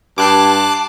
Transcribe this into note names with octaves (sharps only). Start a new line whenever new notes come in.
G2 A5 D6 F#6 C7